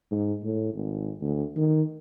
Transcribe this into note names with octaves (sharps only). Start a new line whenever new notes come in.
G#2
A2
G#1
D2
D#3